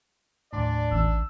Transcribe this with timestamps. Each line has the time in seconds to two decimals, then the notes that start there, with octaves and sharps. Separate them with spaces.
0.53 D#2 A2 D4 D5
0.92 A1 E6